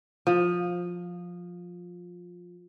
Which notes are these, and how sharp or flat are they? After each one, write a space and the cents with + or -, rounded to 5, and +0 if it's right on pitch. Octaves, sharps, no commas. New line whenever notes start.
F3 +15